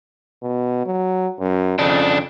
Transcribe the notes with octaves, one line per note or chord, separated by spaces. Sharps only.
B2
F#3
F#2
F2 C#3 D4